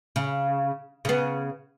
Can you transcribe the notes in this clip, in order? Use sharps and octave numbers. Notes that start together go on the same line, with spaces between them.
C#3
C#3 B3